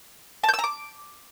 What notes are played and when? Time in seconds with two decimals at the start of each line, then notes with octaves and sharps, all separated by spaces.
0.44 A5
0.49 G6
0.54 E6
0.59 A#5
0.64 D6